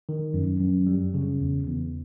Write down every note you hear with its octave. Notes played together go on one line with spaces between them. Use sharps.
D#3
F#2
F#2
G3
C#3
E2
E2